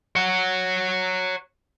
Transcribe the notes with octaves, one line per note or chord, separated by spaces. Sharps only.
C#5 F#5